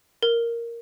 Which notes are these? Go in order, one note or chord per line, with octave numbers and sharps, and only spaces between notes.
A#4